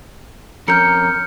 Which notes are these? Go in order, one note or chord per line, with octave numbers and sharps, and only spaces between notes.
F2 C#4 A#4 F6 G6 C#7